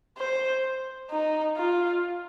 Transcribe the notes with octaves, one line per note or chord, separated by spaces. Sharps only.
C5
D#4
F4